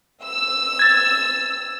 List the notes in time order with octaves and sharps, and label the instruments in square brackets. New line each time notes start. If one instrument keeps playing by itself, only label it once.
[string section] E6
[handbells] G#6 A6